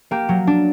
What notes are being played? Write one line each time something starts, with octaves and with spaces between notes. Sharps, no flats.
A#3 G4
F#3
D4